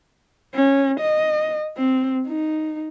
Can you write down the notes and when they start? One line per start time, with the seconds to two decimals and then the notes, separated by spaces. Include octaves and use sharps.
0.55 C#4
1.01 D#5
1.77 C4
2.27 D#4